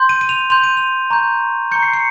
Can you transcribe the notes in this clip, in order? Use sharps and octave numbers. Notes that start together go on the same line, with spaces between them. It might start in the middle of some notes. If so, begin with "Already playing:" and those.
Already playing: C6 G6
D#7
D#7
F7
C6 G6 F7
D#7
F7
A#5 C#6 G6
A#5 C#6 G6 C#7
C7
C#7